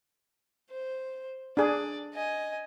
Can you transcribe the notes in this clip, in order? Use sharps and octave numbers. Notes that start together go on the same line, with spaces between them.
C5
D4 G#4 D5
D#5 G#5